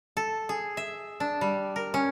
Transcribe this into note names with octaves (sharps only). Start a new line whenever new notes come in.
A4
G#4
E5
D4
G3
A#4
C#4